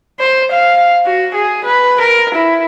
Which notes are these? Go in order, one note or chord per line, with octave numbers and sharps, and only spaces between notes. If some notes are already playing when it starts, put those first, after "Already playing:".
C5
F5
F#4
G#4
B4
A#4
E4